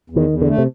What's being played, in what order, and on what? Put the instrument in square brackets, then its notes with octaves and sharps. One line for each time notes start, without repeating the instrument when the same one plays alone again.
[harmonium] E2
[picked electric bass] D#3
[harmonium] E2
[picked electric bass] D3
[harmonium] A3
[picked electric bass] C3